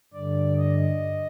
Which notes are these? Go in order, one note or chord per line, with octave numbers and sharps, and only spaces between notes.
G2 D3 D5
D#5